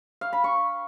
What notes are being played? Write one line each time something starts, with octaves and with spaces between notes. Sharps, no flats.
F5
B5
C#6